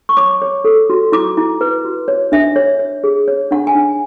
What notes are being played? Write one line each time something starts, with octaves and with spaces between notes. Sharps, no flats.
C#6
C#5 D6
C#5
A4
F#4
E4 D6
E4
B4
F#4
C#5
D4 E5
C#5
C#5
G#4
C#5
D4 F#5
G#5
D4